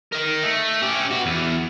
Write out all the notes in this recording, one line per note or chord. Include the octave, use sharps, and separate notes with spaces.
A#4 D#5
A3
C#4 G4
B3 F#4
E2